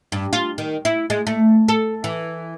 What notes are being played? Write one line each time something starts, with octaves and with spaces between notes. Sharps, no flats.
G2
F4
D#3
E4
G#3
A3
A4
E3